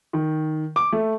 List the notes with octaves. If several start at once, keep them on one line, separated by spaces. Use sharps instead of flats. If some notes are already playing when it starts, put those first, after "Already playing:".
D#3
D6
A3